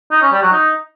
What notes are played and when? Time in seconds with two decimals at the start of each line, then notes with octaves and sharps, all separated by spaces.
0.11 D#4
0.22 C#4
0.32 G3
0.42 F#3
0.52 D#4